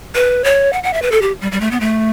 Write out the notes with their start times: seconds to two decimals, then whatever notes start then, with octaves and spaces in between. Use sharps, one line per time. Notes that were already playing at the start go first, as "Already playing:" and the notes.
0.15 B4
0.44 C#5
0.73 F#5
0.83 F#5
0.93 E5
1.02 B4
1.12 A4
1.22 G4
1.41 G3
1.52 G3
1.61 A3
1.71 B3
1.80 A3